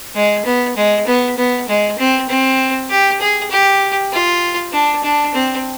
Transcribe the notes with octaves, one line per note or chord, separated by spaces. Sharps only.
G#3
B3
G#3
B3
B3
G#3
C4
C4
G4
G#4
G4
F4
D4
D4
C4